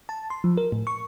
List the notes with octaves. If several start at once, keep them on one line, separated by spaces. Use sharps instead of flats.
A5
C6
F3
A#4
A2
C#6